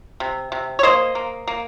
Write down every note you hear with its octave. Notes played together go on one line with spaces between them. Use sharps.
C3
C3
C#5
A#3 C5 D#5
A#3
A#3